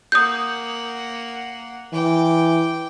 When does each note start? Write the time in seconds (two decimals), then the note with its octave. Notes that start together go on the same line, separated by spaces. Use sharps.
0.12 A#3 F#5 D#6 G6
1.93 E3 G5 D6